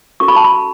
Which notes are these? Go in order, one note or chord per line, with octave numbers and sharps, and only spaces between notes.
C#4 F#4 A4 C#6
B5
A5
B5